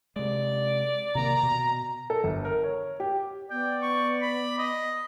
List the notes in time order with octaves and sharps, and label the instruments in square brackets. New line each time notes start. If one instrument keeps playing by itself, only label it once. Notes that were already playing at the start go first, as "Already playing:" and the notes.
[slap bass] C3 G#3 [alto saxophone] D5
[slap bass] C3 D#3 A#3 [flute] A#5
[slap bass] B2
[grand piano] A4
G1
A#4
C#5
G4
[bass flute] B3 [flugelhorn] D5 [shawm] G5
[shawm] C#6
B5
D#5